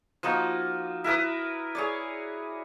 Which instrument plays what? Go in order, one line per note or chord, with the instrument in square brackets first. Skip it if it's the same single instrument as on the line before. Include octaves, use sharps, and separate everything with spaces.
[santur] F3 A#3 D#4 F#4
E4 A#4 B4 D#6
G#4 C#5 D5